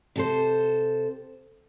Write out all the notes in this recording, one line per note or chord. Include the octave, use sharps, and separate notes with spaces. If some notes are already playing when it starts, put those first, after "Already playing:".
C3 A4 C5